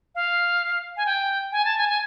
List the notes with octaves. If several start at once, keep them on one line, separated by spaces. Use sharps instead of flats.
F5
G#5
G5
G#5
A5
G#5
G#5